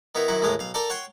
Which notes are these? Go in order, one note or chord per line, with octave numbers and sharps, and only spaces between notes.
D#3 B3 E4 A#4
F#2 D#3 E4 F#5
A1 D#2 A2 G#3 A#4 D#6
B1 F5
A4 A#4 D5 G5 A#5
C#5 F#5 G5 C6